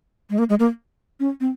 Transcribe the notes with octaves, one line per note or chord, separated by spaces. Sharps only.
G#3
A#3
G#3
A#3
C#4
C4